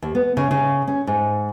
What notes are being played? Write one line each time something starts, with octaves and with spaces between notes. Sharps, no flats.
D#2
B3
C#3
C#3
C#4
G#2